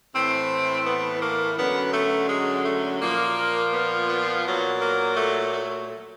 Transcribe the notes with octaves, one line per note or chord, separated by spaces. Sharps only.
A2 E3 C4
B3
A#3
F#2 D3 F#3 B3
A3
G#3
A3
A#2 F3 A#3
B3
B3
A#2 F#3
A#3
A3
A3